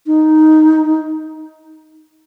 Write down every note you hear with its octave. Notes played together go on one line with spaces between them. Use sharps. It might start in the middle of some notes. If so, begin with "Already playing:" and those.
D#4